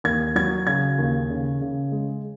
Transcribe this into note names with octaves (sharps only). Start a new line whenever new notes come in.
D#2 G#6
F#3 G#6
C#3 G#6
D#2
C#3
C#3
G#3